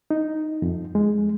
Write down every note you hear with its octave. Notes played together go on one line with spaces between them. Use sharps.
D#4
F2
G#3